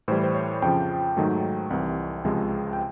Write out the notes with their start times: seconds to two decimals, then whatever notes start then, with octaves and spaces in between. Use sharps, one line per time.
0.08 A2 E3 G3 C5
0.24 C5
0.34 C#5
0.62 F2 C#3 F3 G5
1.17 G#2 D#3 F#3 A3
1.70 C2 C3 E3
2.24 C#2 C3 F3 G#3
2.73 G5